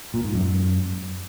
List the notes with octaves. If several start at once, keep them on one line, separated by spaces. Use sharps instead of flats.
A#2
G#2
F#2